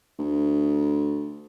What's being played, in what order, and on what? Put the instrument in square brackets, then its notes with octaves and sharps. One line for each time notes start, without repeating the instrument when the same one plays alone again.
[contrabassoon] D2